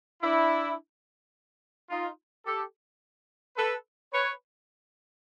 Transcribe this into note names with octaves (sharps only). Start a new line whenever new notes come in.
D4 E4
D#4 F4
G4 A4
A4 B4
B4 C#5